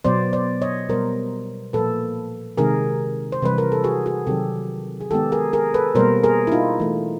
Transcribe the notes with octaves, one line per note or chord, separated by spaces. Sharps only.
B2 F#3 B3 C5 D5
C5 D5
C#5 D#5
B2 G3 B3 A#4 C5
A#2 F3 A#3 A4 B4
C3 D#3 G#3 G#4 A#4
C5
C3 E3 G3 B4
A#4
A4
F#4 G#4
F#4 G#4
C3 D#3 F#3 G4 A4
G#4
D#3 G#3 B3 G4 A4
G#4 A#4
G#4 A#4
A4 B4
B2 G3 A#3 A#4 C5
G#4 A#4
E4
D#4 F4
E3 A3